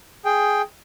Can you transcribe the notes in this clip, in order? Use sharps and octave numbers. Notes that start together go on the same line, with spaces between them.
G#4 G5